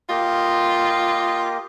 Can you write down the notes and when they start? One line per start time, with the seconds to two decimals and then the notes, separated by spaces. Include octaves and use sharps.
0.09 A#3 F4 G4 D#5